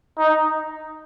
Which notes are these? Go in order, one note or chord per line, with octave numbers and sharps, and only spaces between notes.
D#4